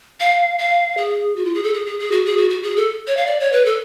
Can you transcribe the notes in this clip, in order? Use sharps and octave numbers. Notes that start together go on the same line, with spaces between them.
F5
F5
G#4
F#4
F4
G#4
A4
G#4
G#4
G#4
F#4
G#4
F#4
F#4
G#4
A4
C#5
F5
D5
C#5
B4
A4